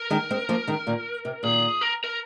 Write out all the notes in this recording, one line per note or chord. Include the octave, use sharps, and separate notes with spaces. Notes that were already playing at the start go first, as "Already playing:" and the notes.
Already playing: A#4
D#3 G#3
G#3 C4
F3 A#3
D#3 G#3
A#2 D#3
C3
A#2 D#3 G#4
A#4
A#4